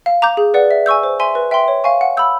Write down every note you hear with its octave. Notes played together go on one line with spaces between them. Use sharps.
F5
A#5 D6 G6
G#4
B4 D5 F#5
E5
G#5 C#6 E6 G6
C5
E5 G#5 C6
B4
E5 G5 C6
C#5
F5 G#5 C#6
F#5
B5 E6 G6